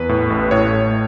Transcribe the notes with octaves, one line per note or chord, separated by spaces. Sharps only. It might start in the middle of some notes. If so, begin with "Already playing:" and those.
Already playing: E2 B4
A2
A1
A2 C#5
A2